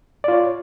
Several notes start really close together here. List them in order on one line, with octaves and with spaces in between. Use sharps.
D5 F4 C#5